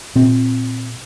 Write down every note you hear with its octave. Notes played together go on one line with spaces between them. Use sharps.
A#2 C4